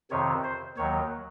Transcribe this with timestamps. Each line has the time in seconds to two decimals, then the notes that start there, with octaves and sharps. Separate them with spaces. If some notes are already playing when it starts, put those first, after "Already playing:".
0.11 F2 C3 D#3 C#5
0.44 C5
0.77 D#2 D#3 F#3 C#5